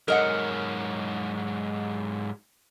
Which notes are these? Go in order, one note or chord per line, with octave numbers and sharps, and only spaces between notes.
G#2 F#3 A#4 D#5 F#5